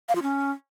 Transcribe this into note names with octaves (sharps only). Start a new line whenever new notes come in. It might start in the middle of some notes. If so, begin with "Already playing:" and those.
F5
F4
C#4